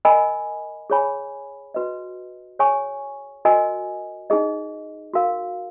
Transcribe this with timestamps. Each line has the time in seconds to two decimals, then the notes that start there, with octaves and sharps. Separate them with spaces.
0.05 A#4 D#5 G#5 B5
0.90 G#4 C#5 G#5 B5
1.74 F#4 B4 D#5
2.59 G#4 C#5 G#5 C#6
3.45 F#4 A#4 D#5 G#5
4.30 D#4 G#4 D#5
5.14 F#4 A#4 F5